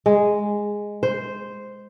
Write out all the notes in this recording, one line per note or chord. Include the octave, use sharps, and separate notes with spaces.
G#3
C5